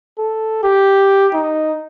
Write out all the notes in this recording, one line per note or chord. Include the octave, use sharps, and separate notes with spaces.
A4
G4
D#4